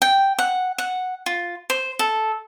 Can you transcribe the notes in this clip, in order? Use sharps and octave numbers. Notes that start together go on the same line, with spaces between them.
G5
F#5
F#5
F4
C5
A4